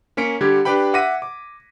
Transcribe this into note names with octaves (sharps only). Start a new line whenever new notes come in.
A#3 C#4 B6 C#7 D7
D3 G3 G4 G#6
D4 G4 B4 G5 B5
E5 F#5 D6 A#6 B6 D#7
D6